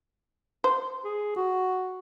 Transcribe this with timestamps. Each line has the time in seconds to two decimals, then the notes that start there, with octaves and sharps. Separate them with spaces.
0.64 C5
1.04 G#4
1.36 F#4